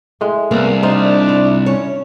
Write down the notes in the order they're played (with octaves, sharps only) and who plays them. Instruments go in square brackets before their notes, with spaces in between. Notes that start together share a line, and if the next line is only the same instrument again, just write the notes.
[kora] A2 G#3
[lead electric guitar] C2 [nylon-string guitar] A#3 [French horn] B3
[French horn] D4 [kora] D#4 F4 [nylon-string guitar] C5
[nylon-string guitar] E4
[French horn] C#4 [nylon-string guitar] C#5